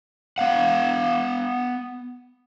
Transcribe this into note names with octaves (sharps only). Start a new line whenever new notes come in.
B3 F5 F#5